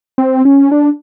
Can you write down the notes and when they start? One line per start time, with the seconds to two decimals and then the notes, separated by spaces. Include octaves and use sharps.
0.18 C4
0.45 C#4
0.72 D4